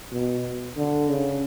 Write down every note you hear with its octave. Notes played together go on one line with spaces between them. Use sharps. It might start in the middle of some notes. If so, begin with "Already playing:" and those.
B2
D3
C#3